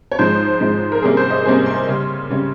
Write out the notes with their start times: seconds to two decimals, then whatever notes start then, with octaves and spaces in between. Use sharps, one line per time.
0.12 C#5
0.19 G#2 F3 G#3 C5
0.60 G#2 F3 G#3
0.92 A#4
1.02 C3 G3 A#3 C#4 G#4
1.17 C5
1.30 D#5
1.45 C3 G3 A#3 C#4 G#5
1.66 C6
1.88 C#3 G3 C#4
2.30 C#3 G3 C#4